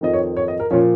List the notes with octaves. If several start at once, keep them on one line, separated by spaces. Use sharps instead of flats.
F2 D#3 D#5
C#5
C#5
D#5
A#4
A#2 F3 C#4